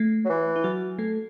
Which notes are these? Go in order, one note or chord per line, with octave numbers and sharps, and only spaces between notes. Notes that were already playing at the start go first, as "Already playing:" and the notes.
Already playing: A3
F#3
E3
E4
F#3 F#4
A3 A4